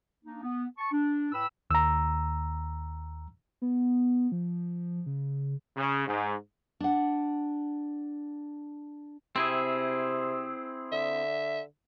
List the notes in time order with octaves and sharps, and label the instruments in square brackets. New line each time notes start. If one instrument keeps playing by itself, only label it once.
[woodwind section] A#3 D4 D#4
B3
A5 C#6
D4
A2 B4 G5 B5 E6
[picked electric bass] D#2 [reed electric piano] A#5 E6
[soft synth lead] B3
F3
C#3
[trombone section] C#3
G#2
[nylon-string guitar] D4 F#5
[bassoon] C3 [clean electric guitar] C4 E4 G#4
[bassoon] D3 [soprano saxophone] E5